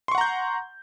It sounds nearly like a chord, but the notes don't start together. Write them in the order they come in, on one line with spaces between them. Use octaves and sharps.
C6 C#6 F#5 A#5 G6